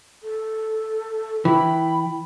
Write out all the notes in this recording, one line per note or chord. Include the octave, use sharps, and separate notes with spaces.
A4
E3 G5 B5